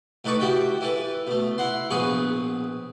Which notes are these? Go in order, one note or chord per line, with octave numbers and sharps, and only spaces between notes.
A2 D#4 B4 A5 C#6 D6
E4 F#4 G4 G5 B5
E3 A4 B4
B2 A3
E4 F#5 C6
A#1 B2 G#4 B4 C#6